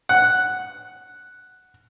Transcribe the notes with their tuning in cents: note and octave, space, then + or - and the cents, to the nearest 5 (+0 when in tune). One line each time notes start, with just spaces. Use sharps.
F#5 +0